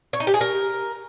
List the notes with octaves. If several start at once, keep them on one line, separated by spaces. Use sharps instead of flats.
C#5
D#4
G4
G#4
A#4